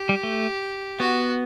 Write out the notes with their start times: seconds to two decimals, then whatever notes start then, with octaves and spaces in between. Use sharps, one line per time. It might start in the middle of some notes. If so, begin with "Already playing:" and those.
Already playing: G4
0.09 G3
0.23 A3
0.99 B3 F#4